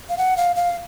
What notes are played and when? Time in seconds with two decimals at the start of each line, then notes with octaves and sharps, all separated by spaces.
0.09 F5
0.18 F#5
0.37 F5
0.56 F5